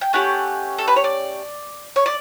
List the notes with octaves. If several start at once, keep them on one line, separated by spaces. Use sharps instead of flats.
G5
A3 C#4 G4 F#5
A4
B4
C#5
D5
C#5
D5